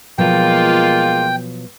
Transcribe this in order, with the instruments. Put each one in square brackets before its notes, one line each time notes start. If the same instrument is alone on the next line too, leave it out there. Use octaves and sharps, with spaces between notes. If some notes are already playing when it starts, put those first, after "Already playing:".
[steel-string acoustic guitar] B2 F3 F#3 [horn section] G#3 A#3 F4 [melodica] G5